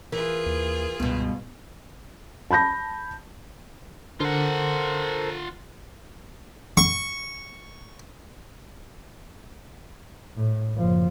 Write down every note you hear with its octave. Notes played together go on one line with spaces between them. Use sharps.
E3 F4 G#4 A#4
D#2
C#2 G2 B2 B3
A5 B5 G6 A#6
D3 F4 A4 A#4 C5 F#5
C#6
A2
F#1 F3